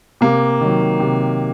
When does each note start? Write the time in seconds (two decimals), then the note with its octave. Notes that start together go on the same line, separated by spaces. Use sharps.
0.21 C3 A#3
0.61 D#3 F#3
1.00 C3